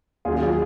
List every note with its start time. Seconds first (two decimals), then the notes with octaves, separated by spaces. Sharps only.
0.25 D#2 D#3 F#3 F4 G#4
0.35 F4 G#4
0.46 F4 G#4